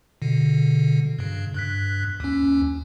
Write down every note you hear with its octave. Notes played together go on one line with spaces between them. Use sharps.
B2 D3
G2 C#3
G2 F#6 B6
D#2 C#4